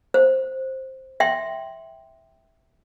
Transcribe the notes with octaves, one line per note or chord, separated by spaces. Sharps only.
C5
E5 G5 C6